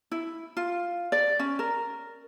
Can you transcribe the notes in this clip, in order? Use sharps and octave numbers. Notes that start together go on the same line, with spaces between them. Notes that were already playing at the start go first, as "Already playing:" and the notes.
E4
F4
D5
C#4
A#4